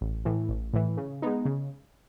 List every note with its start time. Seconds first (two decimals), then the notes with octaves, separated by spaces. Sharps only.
0.01 A1
0.25 A2 E3
0.49 A1
0.73 A2 E3
0.97 C#3
1.22 G#3 B3 D#4
1.45 C#3